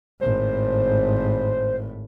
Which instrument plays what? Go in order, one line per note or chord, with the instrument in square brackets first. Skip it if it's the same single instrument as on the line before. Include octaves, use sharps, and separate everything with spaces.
[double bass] G#1 A2 [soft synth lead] C5